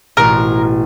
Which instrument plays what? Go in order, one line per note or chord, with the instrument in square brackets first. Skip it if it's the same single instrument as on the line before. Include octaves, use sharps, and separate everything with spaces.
[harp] A1 B2 [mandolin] A#4